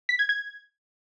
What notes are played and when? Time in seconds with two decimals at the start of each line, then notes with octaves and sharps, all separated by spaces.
0.09 B6
0.19 G#6
0.29 G#6